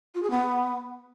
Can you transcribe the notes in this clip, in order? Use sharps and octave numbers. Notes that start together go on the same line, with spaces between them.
F4
G#4
B3